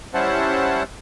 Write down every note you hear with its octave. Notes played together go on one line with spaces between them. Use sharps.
G3 C#4 E4 C5 F#5 A5